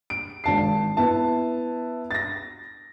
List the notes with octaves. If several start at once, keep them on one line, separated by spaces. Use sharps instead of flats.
D7
G#1 A5 C7
B3 E4 A5
A6 A#6